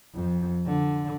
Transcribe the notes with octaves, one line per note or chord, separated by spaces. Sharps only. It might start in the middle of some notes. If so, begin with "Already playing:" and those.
F2
D3